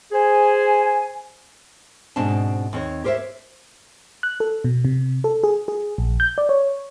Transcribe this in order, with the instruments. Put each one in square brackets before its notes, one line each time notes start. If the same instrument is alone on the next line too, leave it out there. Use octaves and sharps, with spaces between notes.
[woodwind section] G#4 C5 G#5
[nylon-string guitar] G#2 B2 C4 D4 A5
D#2 C4 C#5
G4 A#4 C5 C#5 E5
[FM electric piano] F#6
A4
B2
C3
A4
G#4
G#4
A#1
G6
D5
C#5